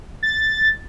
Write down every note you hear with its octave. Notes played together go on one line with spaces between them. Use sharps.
A6